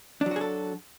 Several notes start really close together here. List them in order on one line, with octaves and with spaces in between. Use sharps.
D4 F#3 F#4 G#4 A4